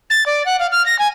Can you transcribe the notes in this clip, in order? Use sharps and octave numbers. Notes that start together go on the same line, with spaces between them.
A6
D5
F#5
F5
F6
A#6
G#5